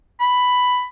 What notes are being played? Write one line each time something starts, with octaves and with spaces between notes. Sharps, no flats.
B5